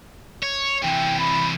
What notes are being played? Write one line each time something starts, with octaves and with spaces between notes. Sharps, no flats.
C#5
C3 E3 G5
B5